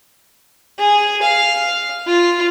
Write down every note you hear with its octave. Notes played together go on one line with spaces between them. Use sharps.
G#4
F5
F4